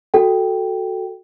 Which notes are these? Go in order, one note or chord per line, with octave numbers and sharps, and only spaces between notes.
F#4 A4 G5